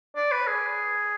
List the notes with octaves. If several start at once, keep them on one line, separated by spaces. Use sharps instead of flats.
D5
B4
G#4